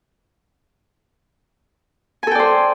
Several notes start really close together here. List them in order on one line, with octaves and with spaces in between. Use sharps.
G#5 A4 G5 D5 C5